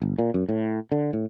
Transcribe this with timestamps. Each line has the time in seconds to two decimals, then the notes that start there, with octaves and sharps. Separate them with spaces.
0.02 G1
0.18 A#2
0.34 F#2
0.49 A2
0.92 D3
1.13 A2